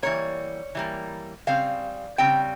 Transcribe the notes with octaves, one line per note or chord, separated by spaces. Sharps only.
E3 G3 A#3 C#5
E3 G3 A#3
C#3 G3 C4 F5
C#3 G3 C4 G5